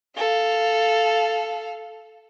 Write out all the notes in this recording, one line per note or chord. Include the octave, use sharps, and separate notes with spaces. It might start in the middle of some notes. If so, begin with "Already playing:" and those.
A4 F5